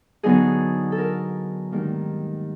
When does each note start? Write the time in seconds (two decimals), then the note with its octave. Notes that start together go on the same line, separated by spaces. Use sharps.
0.23 D3 F#3 B3 D#4 G#4
0.92 A4
0.98 A#4
1.72 G#2 D#3 G3 A#3